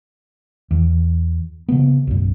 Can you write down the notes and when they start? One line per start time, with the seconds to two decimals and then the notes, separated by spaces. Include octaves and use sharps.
0.71 E2
1.69 C#3 B3
2.07 B1 F#2